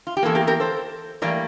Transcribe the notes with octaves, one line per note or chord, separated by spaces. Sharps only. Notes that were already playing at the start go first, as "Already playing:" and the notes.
F4
G4
E2 E3 A#3 A4
G4 A#4
G4 A#4
A4 C5
A2 E3 G3 A#3 A#4 D5